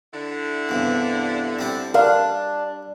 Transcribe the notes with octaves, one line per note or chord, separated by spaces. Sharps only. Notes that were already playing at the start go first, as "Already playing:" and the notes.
D3 E4
E2 G2 C3
G3 C4 A5
G3 D4 A#4 F5